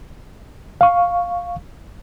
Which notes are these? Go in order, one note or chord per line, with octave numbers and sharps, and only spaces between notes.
F5 C#6